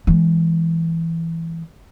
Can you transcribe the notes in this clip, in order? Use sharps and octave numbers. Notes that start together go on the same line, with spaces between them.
E3 G#3